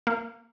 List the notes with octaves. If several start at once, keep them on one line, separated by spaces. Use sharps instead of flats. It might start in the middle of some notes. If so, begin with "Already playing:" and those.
A#3